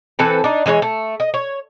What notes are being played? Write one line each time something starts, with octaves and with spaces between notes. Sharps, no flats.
E3 C4 A4 B4
D4 D#4
E3 G#3 B4 C#5
A3
D#5
C#5